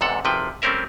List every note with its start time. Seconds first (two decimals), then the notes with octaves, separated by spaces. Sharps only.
0.01 E2 G#2 C3 A4 F#5
0.25 G#1 C3 F3 B4 G5
0.62 G3 A3 C4 C#4 A#4 E5